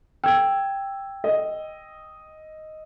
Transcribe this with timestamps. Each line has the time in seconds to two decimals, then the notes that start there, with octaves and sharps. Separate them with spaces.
0.24 G5 E6 G#6
1.24 D#5